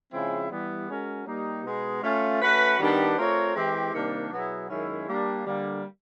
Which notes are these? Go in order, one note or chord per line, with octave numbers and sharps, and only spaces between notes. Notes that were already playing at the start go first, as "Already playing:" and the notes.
C#3 F3 G#3 C4 E4
E3 G3 B3
G#3 C#4 F#4 A#4
G3 A#3 D#4
B2 G#3 B3 D#4 G#4
A3 C#4 F4
A3 C#4 F#4 B4
D#3 G3 B3 D4 G4
A3 C4 F4 A#4 C#5
E3 G#3 C4 E4 G4
C3 D#3 G3 A#3 D4
B2 F#3 B3 E4 G#4
F#2 D#3 G#3 C#4 E4
G3 A#3 D4
D3 G3 A#3